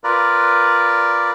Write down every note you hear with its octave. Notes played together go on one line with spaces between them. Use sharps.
F4 A#4 B4 D5